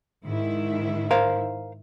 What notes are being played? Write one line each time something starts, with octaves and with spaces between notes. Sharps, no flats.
G#2 D#3 E4
A#4 C5 F5